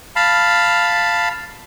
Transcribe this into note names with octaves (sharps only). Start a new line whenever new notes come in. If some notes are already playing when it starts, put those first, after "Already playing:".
F5 A5 B5